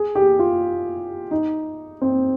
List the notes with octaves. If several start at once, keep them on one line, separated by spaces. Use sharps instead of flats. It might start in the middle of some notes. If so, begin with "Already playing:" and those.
Already playing: G#4
G4
F4
D#4
C4